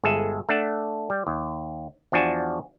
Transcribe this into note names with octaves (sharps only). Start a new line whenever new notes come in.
G1 G#3 G#4 A4 E5
A3 D4 F#5 A5
G3
D#2
E2 F3 D4 F#4 G#5 A5